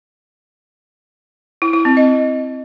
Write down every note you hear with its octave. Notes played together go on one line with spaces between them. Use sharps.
E4
E4
C4
D#5